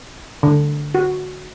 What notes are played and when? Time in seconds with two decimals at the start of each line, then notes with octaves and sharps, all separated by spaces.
0.43 D3
0.95 F#4